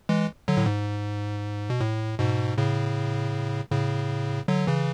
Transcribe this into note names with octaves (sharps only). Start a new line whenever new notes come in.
E3 G#3
D3 F#3
A2
G#2
B2
A2
G#2 B2
A2 C#3
A2 C#3
D3 F#3
C#3 E3